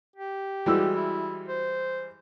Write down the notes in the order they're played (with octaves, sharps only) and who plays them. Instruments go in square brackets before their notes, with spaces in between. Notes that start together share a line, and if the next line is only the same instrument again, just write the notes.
[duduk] G4
[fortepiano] E3 G3 G#3 [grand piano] F#4 E6
[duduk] E4
C5